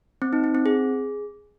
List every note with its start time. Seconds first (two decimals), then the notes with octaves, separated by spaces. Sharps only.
0.22 C4
0.33 D#4
0.44 C4
0.55 C4
0.66 G#4